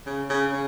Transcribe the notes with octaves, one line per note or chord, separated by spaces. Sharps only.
C#3
C#3
C#3